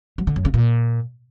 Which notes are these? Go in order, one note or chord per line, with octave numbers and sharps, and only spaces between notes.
F#3
D3
F#2
C#3
A#2